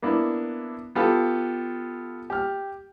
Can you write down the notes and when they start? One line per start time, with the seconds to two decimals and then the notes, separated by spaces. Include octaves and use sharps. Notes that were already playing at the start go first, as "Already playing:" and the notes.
0.02 A#3 B3 D4 E4
0.95 B3 F4 G4 A4
2.30 G4 F6